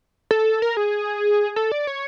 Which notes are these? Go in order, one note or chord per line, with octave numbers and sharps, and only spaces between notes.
A4
A#4
G#4
A4
D5
C#5